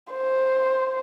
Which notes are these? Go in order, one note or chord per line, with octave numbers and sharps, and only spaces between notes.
C5